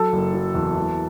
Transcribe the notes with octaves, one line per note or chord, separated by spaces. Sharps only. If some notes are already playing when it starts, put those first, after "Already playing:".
Already playing: F#3 A4
F#1
F#3
E2
E3